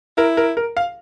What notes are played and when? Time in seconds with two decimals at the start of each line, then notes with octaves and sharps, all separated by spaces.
0.18 E4 A#4
0.37 A#4
0.57 A#4
0.77 F5